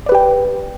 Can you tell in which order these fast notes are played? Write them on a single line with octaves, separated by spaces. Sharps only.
D5 B4 G4 G5